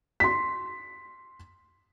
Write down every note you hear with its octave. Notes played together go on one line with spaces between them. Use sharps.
C6 B6